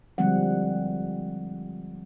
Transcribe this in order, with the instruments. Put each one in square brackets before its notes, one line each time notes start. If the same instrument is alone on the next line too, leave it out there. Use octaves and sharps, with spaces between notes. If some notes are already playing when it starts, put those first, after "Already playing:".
[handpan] D3 F3 G3 G#3 C4 F#5